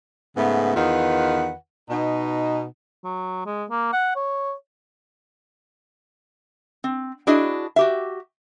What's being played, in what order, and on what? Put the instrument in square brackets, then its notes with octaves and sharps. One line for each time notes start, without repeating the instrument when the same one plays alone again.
[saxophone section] G#2 C#3 A3 B3
E2 D#3 D#4 F4 B4 F#5
B2 D#4
[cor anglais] F#3
G#3
A#3
F#5
C#5
[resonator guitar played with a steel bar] C4
D4 E4 F#4 G#4 D#5
F#4 G4 E5